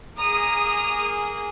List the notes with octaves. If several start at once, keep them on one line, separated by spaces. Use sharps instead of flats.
A#3 G#4 A#5 D#6